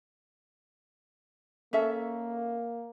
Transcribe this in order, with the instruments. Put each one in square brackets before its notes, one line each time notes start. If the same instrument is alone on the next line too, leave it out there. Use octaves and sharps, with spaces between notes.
[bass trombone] A#3 [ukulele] C#4 A4 E5